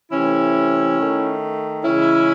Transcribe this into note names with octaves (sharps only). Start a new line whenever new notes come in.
C3 E3 A3 C#4 E4
D#3 A3
C#3 E3 G#3 C#4 E4